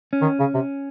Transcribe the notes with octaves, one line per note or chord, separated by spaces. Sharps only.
C#4
D#3
C#3
C3